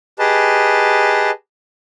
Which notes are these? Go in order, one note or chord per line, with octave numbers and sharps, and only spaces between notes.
G4 G#4 B4 D#5 A5